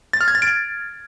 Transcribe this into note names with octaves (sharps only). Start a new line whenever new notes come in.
A6
F6
G#6
A6
D7